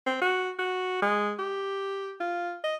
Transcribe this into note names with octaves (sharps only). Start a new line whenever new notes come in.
C4
F#4
F#4
G#3
G4
F4
D#5